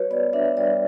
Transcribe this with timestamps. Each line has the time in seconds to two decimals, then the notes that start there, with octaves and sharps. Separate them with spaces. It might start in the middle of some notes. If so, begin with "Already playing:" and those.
Already playing: G3 F#4 B4 C#5
0.11 B3 D5
0.33 D4 E5
0.57 G3 D5